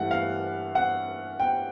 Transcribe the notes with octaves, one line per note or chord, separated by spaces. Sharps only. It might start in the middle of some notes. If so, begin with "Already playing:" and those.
Already playing: G2 E3 A3 F#5
F5
F#5
G5